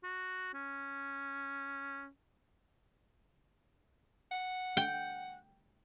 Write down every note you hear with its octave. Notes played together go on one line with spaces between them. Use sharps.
F#4
C#4
F#5
G5